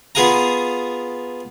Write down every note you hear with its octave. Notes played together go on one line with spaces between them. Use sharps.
B3 F4 G#4 F5 G#5 A#5